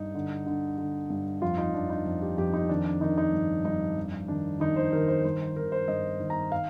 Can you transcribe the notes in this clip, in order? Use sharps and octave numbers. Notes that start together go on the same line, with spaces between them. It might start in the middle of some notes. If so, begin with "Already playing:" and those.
Already playing: G2 D#4
D3
D3
D3
G2
F2 F4
D#4
F2 D4
D#4
F2
G4
F2 G4
D#4
D#3 D4
D4
D#3 D#4
D#4
G2
G2 D#4
F2
D#3 D4
D#3 D#4
C5
D#3 A#4
C5
G2 C5
D#3 A#4
C5
G2 D#5
D#3
A#5
F5